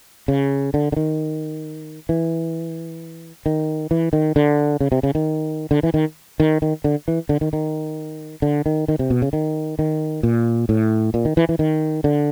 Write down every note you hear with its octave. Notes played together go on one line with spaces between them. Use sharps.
C#3
D3
D3
D#3
E3
D#3
E3
D#3
D3
C#3
C3
C#3
D#3
D3
E3
D#3
D#3
D#3
D3
E3
D3
D#3
D#3
D3
D#3
D#3
C3
B2
C#3
D#3
D#3
A#2
A2
A#2
D#3
E3
E3
D#3
D3